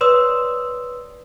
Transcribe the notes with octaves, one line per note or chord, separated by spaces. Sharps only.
B4 C#5 D5 C6 D#6 E6